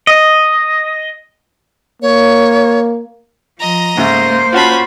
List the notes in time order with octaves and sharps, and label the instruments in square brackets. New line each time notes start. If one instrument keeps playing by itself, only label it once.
[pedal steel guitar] D#5
[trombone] A#3 [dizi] C#5
[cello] F3 [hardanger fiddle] D#5 A#5
[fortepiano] G#2 C#3 A3 [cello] A#3 C5
[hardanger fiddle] C#4 B5 [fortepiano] F4 F#4 A5